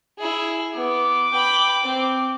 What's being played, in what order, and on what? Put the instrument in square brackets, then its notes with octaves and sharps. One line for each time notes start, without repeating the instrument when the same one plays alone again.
[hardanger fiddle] E4 G#4
[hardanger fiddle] B3 [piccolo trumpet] D6
[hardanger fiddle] G5 B5
C4